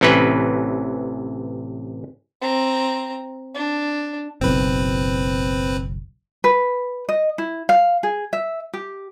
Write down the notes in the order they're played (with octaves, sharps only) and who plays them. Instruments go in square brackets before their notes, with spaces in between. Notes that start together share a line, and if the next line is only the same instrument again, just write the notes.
[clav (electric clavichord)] A1 C3 E3 C#4 B4
[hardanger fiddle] C4 A#5
D4
[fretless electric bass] F#1 B1 [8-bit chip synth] C4 B4
[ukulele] B4
D#5
E4
F5
G#4
E5
G4